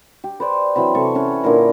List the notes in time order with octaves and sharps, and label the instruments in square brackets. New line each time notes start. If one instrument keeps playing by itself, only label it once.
[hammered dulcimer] G4
B4 C5 D5
E3 F#3 C4 B5
C3 A4 C#6
C#4 B4 C#5
A#2 D3 E4 A#4